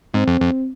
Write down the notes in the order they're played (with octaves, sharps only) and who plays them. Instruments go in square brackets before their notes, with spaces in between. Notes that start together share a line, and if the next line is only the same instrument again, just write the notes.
[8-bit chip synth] G#2 [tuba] C4
[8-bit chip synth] F2
F2